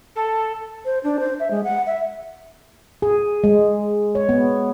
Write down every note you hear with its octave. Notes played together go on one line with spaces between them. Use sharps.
A4
C5
D4
C5
E5
G#3
F#5
E5
G#4
G#3
C#5
B3